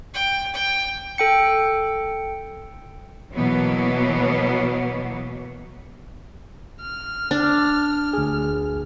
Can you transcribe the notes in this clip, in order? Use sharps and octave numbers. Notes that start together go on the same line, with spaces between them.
G5
G5
A4 G5 C#7
B2 E3 F#3 A#3 B3
F6
D4
D2 G#4